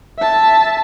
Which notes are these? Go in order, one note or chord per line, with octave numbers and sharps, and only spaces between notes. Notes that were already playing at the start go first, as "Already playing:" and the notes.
E5 A5